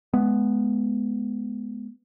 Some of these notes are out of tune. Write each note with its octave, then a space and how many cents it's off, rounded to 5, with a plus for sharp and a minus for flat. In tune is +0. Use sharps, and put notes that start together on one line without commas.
G#3 +25 B3 +0